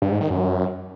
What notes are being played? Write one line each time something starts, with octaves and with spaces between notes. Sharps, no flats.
G2
G#2
D#3
F#2